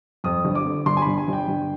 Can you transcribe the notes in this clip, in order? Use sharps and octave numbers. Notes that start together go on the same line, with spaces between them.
F2 D#6
G1
D6
D3
G1 C6
G#5
G1 B5
G#5
G1 G5
G1